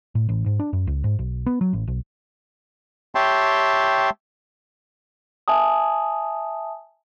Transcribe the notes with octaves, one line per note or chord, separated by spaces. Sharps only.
A2
A1
G#2
D4
F#2
C#2
G#2
B1
B3
F#3
A1
B1
G4 C#5 E5 G5 A5 C6
E5 G#5 A5 D#6